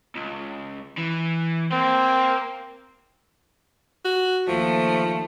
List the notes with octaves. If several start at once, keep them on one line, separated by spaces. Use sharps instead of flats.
C#2
E3
A#3 C4
F#4
D#2 F3 A3